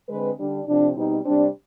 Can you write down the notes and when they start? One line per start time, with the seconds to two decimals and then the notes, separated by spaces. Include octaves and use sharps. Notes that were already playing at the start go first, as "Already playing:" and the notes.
0.09 D3 G#3 C4 B4
0.38 D3 G3 D4
0.66 C3 F3 C4 D4
0.95 B2 G3 C4 D#4
1.24 C3 G3 C4 D4